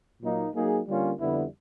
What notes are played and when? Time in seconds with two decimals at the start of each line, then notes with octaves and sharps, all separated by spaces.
0.22 A#2 F#3 A#3 D#4
0.55 F#3 A#3 D#4 G#4
0.87 D3 G3 A#3 C#4 F4
1.19 F2 D3 G3 B3 E4